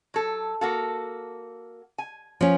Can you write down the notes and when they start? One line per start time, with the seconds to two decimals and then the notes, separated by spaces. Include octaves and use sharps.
0.14 F#3 A4
0.61 A#3 F#4 A4
1.98 G#5
2.41 F3 C#4